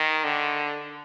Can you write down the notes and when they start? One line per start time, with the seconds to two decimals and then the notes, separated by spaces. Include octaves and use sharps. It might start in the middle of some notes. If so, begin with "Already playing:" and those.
Already playing: D#3
0.24 D3